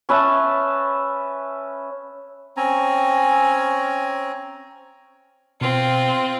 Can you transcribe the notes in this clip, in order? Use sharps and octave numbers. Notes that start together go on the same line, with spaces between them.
C#4 B4 E5 A5
C4 C#4 G#5 A#5
B2 C4 F4